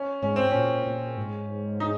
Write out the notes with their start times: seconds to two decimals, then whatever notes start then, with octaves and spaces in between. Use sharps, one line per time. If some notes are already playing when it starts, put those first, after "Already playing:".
Already playing: C#4
0.22 G#2 C#4
0.36 C4
0.51 A#2 C#4
0.86 A#2
1.17 G#2
1.80 D#4